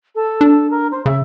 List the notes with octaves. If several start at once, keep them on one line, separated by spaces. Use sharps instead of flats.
A4
D4
A#4
C5
C#3 E5